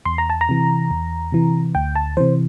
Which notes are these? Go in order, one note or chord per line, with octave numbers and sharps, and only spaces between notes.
E2 C6
A#5
A5
A#5
C3 E3
E2
C3 E3
D2 G5
A5
C3 E3 C5